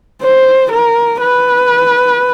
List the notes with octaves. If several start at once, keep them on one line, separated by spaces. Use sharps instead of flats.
C5
A#4
B4